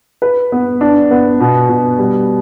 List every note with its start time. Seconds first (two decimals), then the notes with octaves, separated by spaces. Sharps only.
0.22 B4
0.52 B3
0.81 D4
1.11 B3
1.40 B2
1.69 B2
1.98 G3